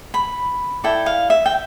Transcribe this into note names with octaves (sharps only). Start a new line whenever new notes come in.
B5
E4 A4 D5 G5
F5
E5
G5